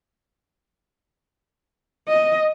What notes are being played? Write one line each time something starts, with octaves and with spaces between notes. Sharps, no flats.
D#5